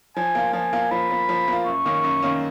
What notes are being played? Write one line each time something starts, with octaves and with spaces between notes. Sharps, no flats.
F3 G#5
A#3 F4
F3 G#5
A#3 F4
F3 B5
A#3 F4
F3
A#3 F4
F#2 C#6
D#3 A#3 C#4
F#2
D#3 A#3 C#4